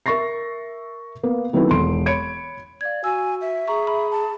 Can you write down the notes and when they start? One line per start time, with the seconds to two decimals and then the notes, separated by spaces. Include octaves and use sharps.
0.06 A#4 E5 C#6 A6 A#6 C7
1.23 A#3 B3
1.53 D#3 F#3 A3 B3 C4 E4
1.70 E1 A4 C6 D7
2.06 C#5 B5 G#6 C#7 D7
2.81 D5 F5 G#6
3.04 F#4 G#5 E6
3.41 E5
3.68 G#4 A#5 C#6
3.87 B5
4.11 A5